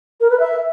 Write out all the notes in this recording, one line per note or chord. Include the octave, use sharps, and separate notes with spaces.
A#4
B4
E5